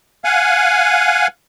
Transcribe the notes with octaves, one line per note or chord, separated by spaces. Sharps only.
F5 F#5 G#5